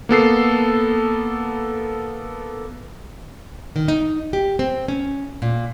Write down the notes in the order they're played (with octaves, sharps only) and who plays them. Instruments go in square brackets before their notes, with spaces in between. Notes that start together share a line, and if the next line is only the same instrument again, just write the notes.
[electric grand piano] A#3 B3 A4 C7
[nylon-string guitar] D#3
D#4
G4
C4
C#4
A#2